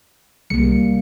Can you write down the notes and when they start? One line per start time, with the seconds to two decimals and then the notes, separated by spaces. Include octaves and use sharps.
0.50 C2 G3 A#3 C#7